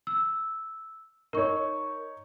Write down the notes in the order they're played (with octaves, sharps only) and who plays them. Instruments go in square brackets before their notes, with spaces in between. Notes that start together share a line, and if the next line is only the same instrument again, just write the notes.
[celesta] E6
[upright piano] D#4 C#5 [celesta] A#4 C#6